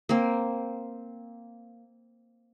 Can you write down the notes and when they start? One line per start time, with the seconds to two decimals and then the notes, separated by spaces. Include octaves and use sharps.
0.09 A#3 C4